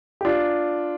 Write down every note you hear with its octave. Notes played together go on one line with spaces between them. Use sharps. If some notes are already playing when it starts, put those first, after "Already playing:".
G4
D4 F4